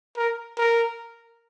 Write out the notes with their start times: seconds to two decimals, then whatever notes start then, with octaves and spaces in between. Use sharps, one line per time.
0.17 A#4
0.58 A#4